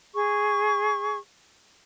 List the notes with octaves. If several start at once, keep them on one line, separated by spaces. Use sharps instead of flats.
G#4 C#6